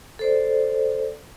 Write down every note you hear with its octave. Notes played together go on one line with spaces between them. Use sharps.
A4 C5 D5